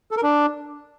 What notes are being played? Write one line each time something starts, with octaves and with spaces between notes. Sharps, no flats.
A4
A#4
D4